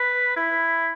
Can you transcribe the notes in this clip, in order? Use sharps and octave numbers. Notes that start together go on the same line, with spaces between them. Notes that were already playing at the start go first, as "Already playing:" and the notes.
Already playing: B4
E4